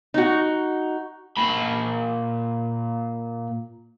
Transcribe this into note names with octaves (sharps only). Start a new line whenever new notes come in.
D#4 F#4
A#2 B5